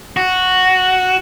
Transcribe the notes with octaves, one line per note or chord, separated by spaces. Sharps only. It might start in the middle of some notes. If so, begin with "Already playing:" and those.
F#4